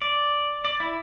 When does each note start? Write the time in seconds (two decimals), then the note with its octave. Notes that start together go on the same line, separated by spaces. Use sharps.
0.02 D5
0.65 D5
0.80 E4